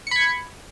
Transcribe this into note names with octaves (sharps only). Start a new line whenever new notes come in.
B5 G#6 C#7